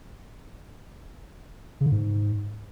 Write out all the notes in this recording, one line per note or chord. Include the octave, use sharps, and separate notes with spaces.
C#3
D3
G#2